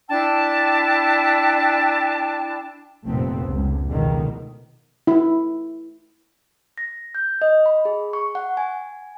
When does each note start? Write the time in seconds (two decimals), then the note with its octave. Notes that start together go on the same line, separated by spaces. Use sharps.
0.09 D4 E4 G5 A5
3.07 F1 G2 A#2 A3 B3 C4
3.41 C#2
3.90 F1 C#2 B2 D3 D#3
5.07 E4
6.78 A#6
7.15 G6
7.42 D#5
7.66 B5
7.85 G#4
8.13 C#6
8.35 F#5
8.57 G#5